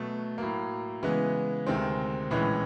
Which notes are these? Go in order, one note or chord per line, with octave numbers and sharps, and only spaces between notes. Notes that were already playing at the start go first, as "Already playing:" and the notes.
Already playing: B2 F#3 A3
A2 F#3 A#3
C#3 E3 G#3 B3
D2 C3 D#3 G#3 C4
A#1 A2 E3 G#3 C#4